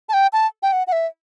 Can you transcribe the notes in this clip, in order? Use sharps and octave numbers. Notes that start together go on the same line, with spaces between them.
A5
G5
A5
G5
F#5
F#5
E5